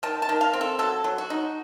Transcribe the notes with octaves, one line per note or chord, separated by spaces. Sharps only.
D#3 A5
A5
D#3
F5
C4
A4
F#3 A4
F#3
F#4
D#4